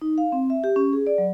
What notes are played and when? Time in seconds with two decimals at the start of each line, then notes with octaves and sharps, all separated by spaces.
0.02 D#4
0.18 F5
0.32 C4
0.50 E5
0.64 G4
0.76 C#4
0.93 G#4
1.07 D5
1.18 F#3